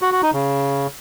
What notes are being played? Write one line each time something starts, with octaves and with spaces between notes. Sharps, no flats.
F#4
F#4
D#4
C#3